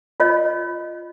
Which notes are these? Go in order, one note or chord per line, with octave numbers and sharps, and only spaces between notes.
F4 C#5 D#5